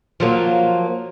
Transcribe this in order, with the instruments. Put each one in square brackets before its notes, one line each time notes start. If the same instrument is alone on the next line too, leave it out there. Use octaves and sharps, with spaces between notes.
[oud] F3 F#3 A#3